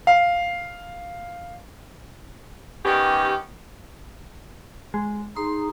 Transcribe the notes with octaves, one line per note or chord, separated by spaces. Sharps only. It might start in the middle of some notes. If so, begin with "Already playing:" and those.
F5
D#3 B3 C#4 G4
G#3
D#4 G#4 C6